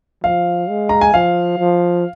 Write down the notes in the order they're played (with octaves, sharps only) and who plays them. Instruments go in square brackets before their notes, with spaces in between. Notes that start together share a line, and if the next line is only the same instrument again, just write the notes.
[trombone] F3 [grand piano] F5
[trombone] G#3
[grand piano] A#5
G#5
[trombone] F3 [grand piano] F5
[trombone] F3